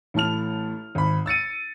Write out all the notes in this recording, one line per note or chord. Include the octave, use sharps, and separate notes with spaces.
A1 A2 A5 F6 F7
G#1 B5
E6 A6 C#7 D#7